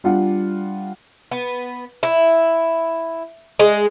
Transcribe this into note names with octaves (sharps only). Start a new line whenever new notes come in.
G3 D4 F4 F#5
B3
E4
G#3